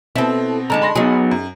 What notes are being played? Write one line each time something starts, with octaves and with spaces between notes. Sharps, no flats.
B2 B3 C4 E4 A4
D3 G#3 D#4 A5 A#5
B5 C6 A#6
F#3 B3 D#4 G#4
F#2